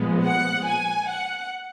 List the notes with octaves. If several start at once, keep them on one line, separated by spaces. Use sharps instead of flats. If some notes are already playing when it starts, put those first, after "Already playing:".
Already playing: A#2 F3 G#3 B3
F#5
G#5
F#5